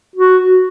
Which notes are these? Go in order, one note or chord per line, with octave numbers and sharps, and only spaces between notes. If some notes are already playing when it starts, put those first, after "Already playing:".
F#4